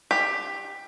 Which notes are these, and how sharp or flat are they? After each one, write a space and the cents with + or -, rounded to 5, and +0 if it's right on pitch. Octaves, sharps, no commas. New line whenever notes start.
G4 +15